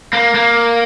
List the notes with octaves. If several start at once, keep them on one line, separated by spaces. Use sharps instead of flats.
A#3
A#3